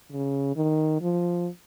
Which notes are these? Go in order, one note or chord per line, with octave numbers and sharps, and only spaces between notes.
C#3
D#3
F3